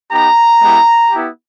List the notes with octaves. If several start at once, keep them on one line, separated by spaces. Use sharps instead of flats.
B3 D#4 G4 A#5
G#3 B3 E4 G4
B3 E4 G4